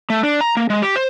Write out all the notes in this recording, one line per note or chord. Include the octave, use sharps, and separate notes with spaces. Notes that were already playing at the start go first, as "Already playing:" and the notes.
A3
D4
A#5
A#3
G#3
G4
C5